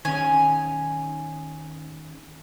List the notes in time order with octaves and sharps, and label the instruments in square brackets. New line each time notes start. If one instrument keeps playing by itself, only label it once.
[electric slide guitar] D#3 C#4 [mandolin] G#5